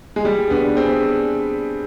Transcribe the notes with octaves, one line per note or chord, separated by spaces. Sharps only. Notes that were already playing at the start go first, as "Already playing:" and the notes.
G#3
G3 G#4
B3 D4
C4 G#4